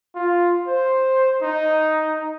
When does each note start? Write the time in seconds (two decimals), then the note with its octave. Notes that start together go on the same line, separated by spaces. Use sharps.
0.15 F4
0.68 C5
1.42 D#4